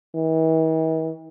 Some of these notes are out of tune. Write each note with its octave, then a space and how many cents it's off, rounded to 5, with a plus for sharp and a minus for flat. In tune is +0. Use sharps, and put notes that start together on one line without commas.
E3 -45